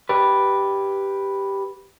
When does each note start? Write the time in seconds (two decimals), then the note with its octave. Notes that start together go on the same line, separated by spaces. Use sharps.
0.09 G4 B4